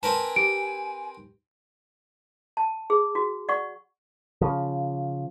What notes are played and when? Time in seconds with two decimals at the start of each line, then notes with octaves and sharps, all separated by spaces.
0.03 C4 A#4 B4 G#5 A5
0.36 G4 D7
2.57 A5
2.90 G#4
3.15 F#4
3.49 D5 F#5 C#6
4.41 C#3 F3